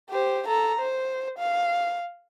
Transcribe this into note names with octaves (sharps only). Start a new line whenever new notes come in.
G4 C5
A4 A#5
C5
F5